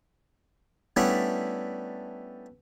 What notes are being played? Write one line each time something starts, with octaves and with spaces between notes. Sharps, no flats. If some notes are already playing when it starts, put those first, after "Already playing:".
G3 A3 B3 C#4 D4 E4